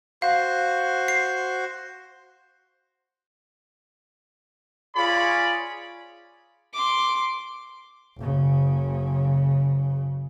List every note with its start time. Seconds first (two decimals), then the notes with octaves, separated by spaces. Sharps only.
0.22 F#4 C5 F5
1.08 C7
4.96 F4 G#4 C#5 D5 B5
6.73 C6 D6
8.17 F#1 C#3